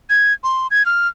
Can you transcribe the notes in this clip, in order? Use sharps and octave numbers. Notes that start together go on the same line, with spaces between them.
G#6
C6
G#6
F6